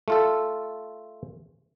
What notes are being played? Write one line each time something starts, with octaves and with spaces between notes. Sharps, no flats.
A3 F4 A4